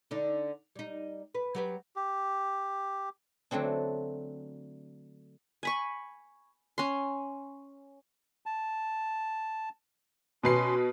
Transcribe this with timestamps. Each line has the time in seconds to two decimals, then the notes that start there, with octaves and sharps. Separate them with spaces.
0.11 D3 D4 D#4
0.76 G3 D#4
1.35 B4
1.55 F#3 G4 B4
1.96 G4
3.51 D3 F#3 A3 C4 D4
5.63 G#5 B5 C#6
6.78 C#4 C6
8.46 A5
10.44 B2 C#4 B4 C6 C7